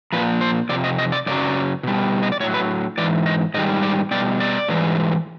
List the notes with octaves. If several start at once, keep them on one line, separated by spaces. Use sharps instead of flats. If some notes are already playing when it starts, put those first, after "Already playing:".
A#2 F3 B4
C5
F2 C3 D5
D#5
D#5
D5
F#2 C#3 F#3 D5
B2 G3
D#5
D5
A2 F#3 C#5
B4
G#2 E3 D5
D#5
G#2 D#3 G3 D#5
D5
B2 G3 D5
D5
G#2 E3 G3